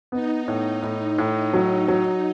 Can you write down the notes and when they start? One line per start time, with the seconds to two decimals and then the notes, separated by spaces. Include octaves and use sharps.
0.12 B3 D#4
0.48 A2
0.82 A2 D#4
1.18 A2
1.53 F#3
1.88 F#3